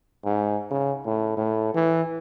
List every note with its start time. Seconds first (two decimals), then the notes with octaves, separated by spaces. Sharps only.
0.25 G#2
0.71 C#3
1.05 A2
1.37 A2
1.74 E3